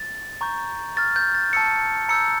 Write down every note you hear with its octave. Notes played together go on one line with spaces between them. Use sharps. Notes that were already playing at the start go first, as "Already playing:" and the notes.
Already playing: A6
A#5 C#6 G6
C#6 F6 A6
G6
A6
A5 C#6 E6 G6 C#7
A#5 E6 G6 C#7